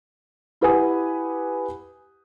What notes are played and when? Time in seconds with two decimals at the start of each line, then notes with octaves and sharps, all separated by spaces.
0.61 E4 G4 B4 F#5 G#5 D#6